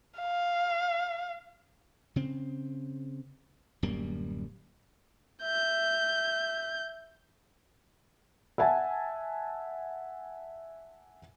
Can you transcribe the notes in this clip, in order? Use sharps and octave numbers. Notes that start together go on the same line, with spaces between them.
F5
C#3 C4
D1 F#2 G3 A#3
E5 G6
E5 F#5 G#5 A5